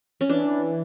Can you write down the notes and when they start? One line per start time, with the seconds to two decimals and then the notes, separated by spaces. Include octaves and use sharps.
0.21 C#4
0.29 E3 D4